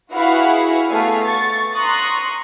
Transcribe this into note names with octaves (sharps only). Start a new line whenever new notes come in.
E4 F#4 G#4 B4 F5 F#5
A3 B3 F5 G#5
C#6 A6
A#5 C6 C#6 D#6 F#6 A#6